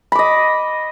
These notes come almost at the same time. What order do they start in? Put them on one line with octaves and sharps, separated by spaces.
B5 D6 D#5